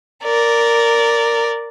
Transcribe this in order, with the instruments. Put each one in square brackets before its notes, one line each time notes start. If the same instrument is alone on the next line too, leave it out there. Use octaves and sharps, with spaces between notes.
[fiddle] A#4 D5